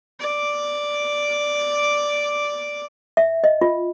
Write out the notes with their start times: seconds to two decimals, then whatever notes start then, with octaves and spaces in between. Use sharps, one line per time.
0.20 D5 D6
3.17 E5
3.44 D#5
3.61 F4